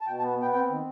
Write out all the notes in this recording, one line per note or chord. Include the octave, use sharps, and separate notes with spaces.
A5
B2 G5
A5
B3
B3 G5
C4 G5
D#3